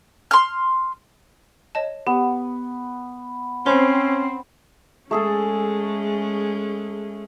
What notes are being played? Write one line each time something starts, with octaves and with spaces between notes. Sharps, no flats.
C6 F6
C#5 D#5 A5
B3 G4
C4 C#4 C5 B5 C6
G#3 A3 C#4 G#4 A4